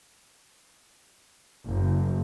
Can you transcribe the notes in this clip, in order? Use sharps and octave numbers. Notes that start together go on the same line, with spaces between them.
F#1